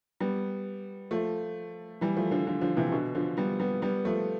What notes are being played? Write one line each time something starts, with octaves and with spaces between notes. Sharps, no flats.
G3 B3
F3 A3
E3 G3
F3 A3
D3 F3
D3 F3
D3 F3
C3 E3
B2 D3
D3 F3
G3 B3
G3 B3
G3 B3
F3 A3